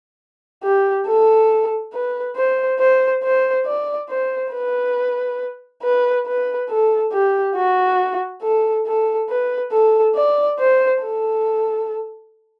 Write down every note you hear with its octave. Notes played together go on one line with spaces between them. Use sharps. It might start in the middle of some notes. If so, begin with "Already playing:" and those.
G4
A4
B4
C5
C5
C5
D5
C5
B4
B4
B4
A4
G4
F#4
A4
A4
B4
A4
D5
C5
A4